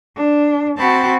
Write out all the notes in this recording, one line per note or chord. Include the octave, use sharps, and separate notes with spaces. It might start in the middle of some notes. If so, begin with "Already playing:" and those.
D4
C4 F#4 G5 A5 B5